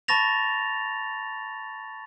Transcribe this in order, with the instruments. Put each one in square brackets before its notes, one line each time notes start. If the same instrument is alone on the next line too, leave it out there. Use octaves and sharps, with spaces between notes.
[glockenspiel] A5 B5 C#6 A6 A#6 F7